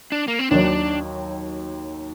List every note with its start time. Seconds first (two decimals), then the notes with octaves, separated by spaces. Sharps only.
0.12 D4
0.28 A#3
0.39 C4
0.51 D#2 D#3 F#3 D4